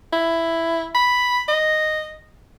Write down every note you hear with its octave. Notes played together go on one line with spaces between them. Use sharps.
E4
B5
D#5